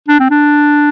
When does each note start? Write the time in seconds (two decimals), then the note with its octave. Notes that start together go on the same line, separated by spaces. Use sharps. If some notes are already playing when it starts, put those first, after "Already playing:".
0.08 D4
0.20 C4
0.30 D4